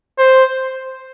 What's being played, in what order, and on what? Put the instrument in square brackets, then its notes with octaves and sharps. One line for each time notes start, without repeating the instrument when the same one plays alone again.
[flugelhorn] C5